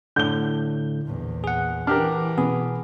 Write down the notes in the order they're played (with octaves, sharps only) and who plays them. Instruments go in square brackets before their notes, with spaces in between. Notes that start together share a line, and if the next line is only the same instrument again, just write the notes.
[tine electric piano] A2 D3 [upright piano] G6 G7
[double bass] A#1 E2
[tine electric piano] G#4 F#5
[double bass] E3 [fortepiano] D4 G4 A#4 [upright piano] F6
[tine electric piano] B2 G#4 [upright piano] B3